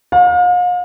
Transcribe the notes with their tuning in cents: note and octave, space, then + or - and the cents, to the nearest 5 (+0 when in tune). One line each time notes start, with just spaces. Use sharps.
F5 +40